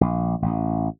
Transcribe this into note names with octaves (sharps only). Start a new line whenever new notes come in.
A#1
A1